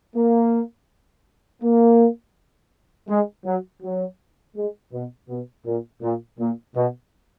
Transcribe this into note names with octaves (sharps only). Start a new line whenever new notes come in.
A#3
A#3
G#3
F#3
F#3
G#3
B2
B2
A#2
A#2
A#2
B2